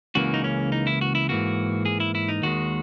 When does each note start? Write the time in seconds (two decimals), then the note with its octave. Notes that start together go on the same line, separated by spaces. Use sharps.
0.15 C#2 C#3 E3 A#3 F#4
0.34 D#4
0.44 C#4
0.72 D#4
0.87 E4
1.01 F#4
1.15 E4
1.29 G#2 E3 A#3 F#4
1.85 G#4
2.00 E4
2.15 E4
2.29 D#4
2.43 D#2 D#3 G#3 F#4